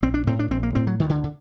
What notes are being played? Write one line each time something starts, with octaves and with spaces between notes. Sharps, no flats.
A#1 C4
D4
A2 C4
D4
A#1 C4
A#3
A2 C4
F#3
D2 D#3
D3
D3